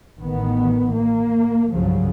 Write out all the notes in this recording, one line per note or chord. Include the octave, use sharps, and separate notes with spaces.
A1 D#3 B3
A#3
C2 G2 C#3 F3 F#3